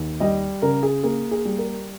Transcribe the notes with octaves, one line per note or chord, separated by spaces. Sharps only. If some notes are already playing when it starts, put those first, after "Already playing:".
Already playing: D#2
G3 D#5
C#3 A#4
G#4
A#3 G#4
G#4
G3
A#4